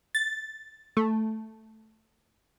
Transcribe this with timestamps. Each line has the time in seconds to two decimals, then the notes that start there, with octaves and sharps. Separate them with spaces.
0.15 A6
0.97 A3